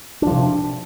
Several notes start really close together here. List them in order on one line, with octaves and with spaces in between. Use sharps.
D4 F3 C3